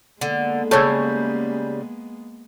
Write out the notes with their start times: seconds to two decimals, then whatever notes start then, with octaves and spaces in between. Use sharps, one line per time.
0.21 D3 G#3 A#3 B3
0.71 C#3 G3 A4 C#5